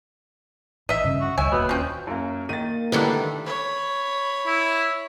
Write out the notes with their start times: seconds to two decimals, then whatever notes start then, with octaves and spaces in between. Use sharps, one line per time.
0.89 A1 D#5 E5
1.04 G2 C#3
1.21 F#4 E6
1.38 C#2 G3 C#5 D#5 E5 G#5
1.52 D#1 A#3 B3 F#4 B4
1.69 F3 C#4 B4 G5
2.07 F#2 A#3
2.49 D#3 A#3 A6 D#7
2.92 G2 D3 D#3 G3 A3 D4 E4 B4
3.45 C#5 B5
4.46 E4